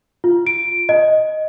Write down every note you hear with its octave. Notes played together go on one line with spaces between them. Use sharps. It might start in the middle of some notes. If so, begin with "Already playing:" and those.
F4
D7
D#5